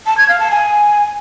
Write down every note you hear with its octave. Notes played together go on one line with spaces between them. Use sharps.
A5
G#6
F5
A5
G#5